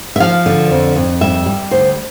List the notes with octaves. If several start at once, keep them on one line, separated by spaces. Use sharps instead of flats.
E5
F3 F5
D3
F2
F2
G3 E5
G3
D2 C5